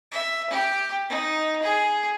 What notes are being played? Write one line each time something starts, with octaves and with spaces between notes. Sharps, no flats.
E5
G4
D#4
G#4